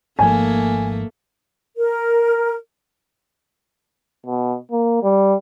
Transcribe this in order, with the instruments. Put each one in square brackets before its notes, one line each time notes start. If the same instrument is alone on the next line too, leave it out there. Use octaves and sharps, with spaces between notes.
[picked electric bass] G#1 G#2 F3 [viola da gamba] A3 A#3 [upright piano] G#5
[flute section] A#4
[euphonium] B2
A#3
G3